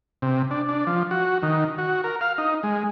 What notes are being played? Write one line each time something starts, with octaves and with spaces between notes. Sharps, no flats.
C3
D4
D4
F3
F#4
D#3
F#4
A#4
F5
D#4
G#3